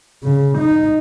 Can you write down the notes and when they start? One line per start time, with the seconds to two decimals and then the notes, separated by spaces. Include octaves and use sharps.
0.23 C#3
0.58 D#4